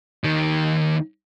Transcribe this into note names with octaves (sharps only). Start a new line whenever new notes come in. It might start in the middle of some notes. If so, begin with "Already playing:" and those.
D#2 D#3